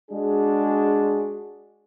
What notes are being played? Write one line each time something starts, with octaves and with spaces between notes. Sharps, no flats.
G#3 D4 F#4 G#4